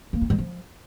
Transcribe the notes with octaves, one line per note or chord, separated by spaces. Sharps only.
A#3
E4
G3
F3